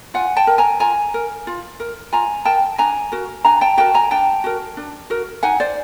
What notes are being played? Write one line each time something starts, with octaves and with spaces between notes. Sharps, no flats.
F4 F#5 G#5
G5 A5
A#4
G#5 A#5
F4 G#5 A#5
A#4
F4
A#4
F4 G#5 A#5
A#4 G5 A5
D4 G#5 A#5
F#4 A#4
D4 G#5 A#5
G5 A5
F#4 A#4 G5 A5
G#5 A#5
D4 G5 A5
F#4 A#4
D4
F#4 A#4
D#4 F#5 G#5
C5 D5